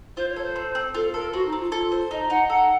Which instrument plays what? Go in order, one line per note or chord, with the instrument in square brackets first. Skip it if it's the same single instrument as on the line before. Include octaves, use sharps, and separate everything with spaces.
[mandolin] F4 [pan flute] C5
[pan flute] C#5
[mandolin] A4
[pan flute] C5
[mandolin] C4
C4
[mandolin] F4 [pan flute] A4
[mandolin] A4 [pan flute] A#4
[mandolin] C4 [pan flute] F#4
[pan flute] D#4
[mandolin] C4
[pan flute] F4
[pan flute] F4 [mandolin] A4
[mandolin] C5
[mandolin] D#4 [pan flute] D#5
[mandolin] D#4 [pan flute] F#5
[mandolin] A4 [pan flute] F#5